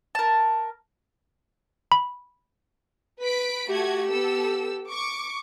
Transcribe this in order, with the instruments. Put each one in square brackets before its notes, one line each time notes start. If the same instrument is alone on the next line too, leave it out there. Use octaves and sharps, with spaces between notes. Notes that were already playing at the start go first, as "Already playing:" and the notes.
[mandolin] A#4 A5
[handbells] B5
[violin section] B4 B6 D7
[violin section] A3 F#4 G#6 [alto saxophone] G4
[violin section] B3 A4 E6
C#6 D6